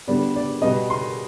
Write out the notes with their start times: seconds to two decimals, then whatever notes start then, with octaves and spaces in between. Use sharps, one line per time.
0.08 D3 G3 B3 D5
0.36 D5
0.62 B2 G3 B3 D#5
0.90 C6